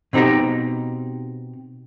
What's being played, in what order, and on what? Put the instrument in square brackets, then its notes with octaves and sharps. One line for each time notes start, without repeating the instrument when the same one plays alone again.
[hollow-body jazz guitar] B2 C4 D#4 G4 A#5